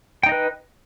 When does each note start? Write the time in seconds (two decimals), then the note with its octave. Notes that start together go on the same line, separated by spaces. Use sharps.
0.23 G5
0.26 D#4
0.29 D#5
0.32 B4